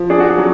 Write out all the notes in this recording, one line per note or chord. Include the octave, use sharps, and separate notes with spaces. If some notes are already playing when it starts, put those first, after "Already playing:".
Already playing: F3
D4 G#4
F#4
G#4
F#3